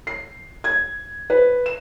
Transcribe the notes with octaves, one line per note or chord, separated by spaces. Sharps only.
C7
G#6
B4
E7